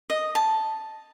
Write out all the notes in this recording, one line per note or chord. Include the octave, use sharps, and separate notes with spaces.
D#5
A5